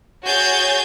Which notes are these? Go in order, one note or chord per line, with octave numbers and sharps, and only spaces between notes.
F#4 G#4 C#5 G#5 G6 A6